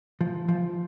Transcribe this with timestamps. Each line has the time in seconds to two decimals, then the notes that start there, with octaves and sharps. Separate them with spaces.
0.21 F3
0.48 F3